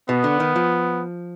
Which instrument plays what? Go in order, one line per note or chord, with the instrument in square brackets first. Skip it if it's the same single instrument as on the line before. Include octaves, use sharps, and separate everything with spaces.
[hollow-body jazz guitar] B2 [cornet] B3
[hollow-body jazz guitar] D3
D#3
F3